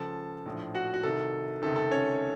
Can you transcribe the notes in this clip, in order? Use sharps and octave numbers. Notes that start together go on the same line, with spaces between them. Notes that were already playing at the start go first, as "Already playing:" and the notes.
Already playing: C#2 C#3 F3 A4 A5
A#1 A2 F3
F#4 F#5
F#4
C2 C3 D#3 A4
C#2 C3 D#3 A4
A4
C#4 C#5